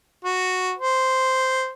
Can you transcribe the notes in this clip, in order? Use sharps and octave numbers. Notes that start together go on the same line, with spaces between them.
F#4
C5